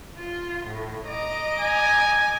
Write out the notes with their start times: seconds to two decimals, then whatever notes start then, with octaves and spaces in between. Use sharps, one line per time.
0.17 F4
0.68 A2
1.07 D#5 A#5 D6
1.60 G#5